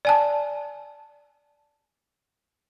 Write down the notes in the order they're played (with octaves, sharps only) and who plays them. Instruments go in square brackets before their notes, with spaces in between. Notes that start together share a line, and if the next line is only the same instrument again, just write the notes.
[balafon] D5 G#5 A5